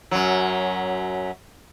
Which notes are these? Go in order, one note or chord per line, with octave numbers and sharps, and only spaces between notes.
F#2 F#3